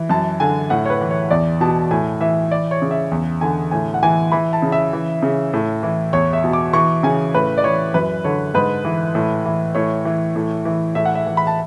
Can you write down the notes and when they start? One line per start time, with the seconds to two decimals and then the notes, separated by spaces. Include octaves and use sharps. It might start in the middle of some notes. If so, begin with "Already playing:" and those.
Already playing: E3
0.10 F#2 A5
0.40 D3 G#5
0.70 A2 F#5
0.85 C#5
0.90 B4
1.01 E3
1.11 C#5
1.31 E2 D5
1.61 B2 A5
1.91 A2 G#5
2.20 E3 E5
2.51 E3 D5
2.71 C#5
2.82 C#3
2.91 E5
3.12 E2
3.41 D3 G#5
3.71 A2 G#5
3.94 F#5
4.03 E3 G#5
4.32 E3 B5
4.53 A5
4.62 C#3
4.72 E5
4.93 E3
5.22 C#3
5.53 A2
5.83 E3
6.13 E2 C#5
6.33 E5
6.44 B2
6.53 D6
6.73 E3 C#6
7.03 C#3 G#5
7.34 A2 B4
7.58 D5
7.64 E3 C#5
7.94 F#2 B4
8.24 D3 C#5
8.54 G#2 B4
8.85 E3
9.15 A2
9.45 E3
9.75 A2 C#5
10.05 E3
10.36 A2
10.65 E3
10.95 A2 E5
11.05 F#5
11.15 E5
11.27 E3
11.37 B5
11.47 A5